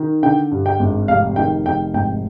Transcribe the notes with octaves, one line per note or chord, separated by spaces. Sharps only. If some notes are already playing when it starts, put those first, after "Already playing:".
Already playing: D#3
D3 G5
G2
G5
G#1
F1 F5
D#3 G5
F1 G5
G#1 G5